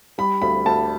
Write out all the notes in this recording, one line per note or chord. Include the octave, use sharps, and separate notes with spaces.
G3 B5
D2 B5
D2 A5